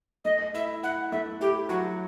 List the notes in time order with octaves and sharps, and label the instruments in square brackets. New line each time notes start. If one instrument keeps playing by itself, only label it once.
[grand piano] A3 [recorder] D#5
[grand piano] E4 [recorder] E5
[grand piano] E4 [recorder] F#5
[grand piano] A3 [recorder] E5
[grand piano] E4 [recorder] G4
[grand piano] F#3 [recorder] F#4